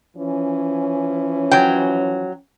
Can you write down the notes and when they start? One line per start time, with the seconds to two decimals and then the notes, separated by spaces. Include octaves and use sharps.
0.17 E3 F3 C#4
1.51 F#3 G5